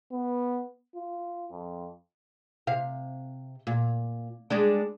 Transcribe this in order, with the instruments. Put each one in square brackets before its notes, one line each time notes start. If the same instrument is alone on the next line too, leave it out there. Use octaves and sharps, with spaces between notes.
[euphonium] B3
F4
F2
[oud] C3 F5
A#2
G3 G#3 D4